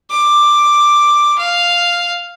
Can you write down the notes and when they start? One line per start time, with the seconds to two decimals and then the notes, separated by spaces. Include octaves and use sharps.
0.10 D6
1.38 F5